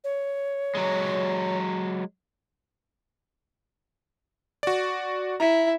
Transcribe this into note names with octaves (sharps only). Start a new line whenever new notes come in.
C#5
F#3 G#3
F#4 D5
E4 A#5